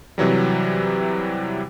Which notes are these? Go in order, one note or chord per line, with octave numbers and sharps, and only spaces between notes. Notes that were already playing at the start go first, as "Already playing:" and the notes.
C3 E3 F#3 G3